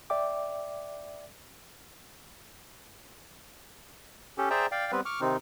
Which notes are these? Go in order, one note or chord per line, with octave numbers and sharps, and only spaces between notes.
D5 E5 G5 D6
C#4 G4 A4
G#4 C5 D5 E5 G5 A#5
D5 F5 G5
G3 B3 C4 B4
C#6 D6 F6
C3 D#3 C4 D#4